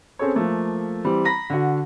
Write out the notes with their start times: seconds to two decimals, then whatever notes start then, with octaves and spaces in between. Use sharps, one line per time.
0.19 C4 C#4 G#4 A4 C#5
0.35 F3 A3 A#3
1.04 E3 G3 C4
1.25 A#5 B5 A#6
1.50 D3 F#4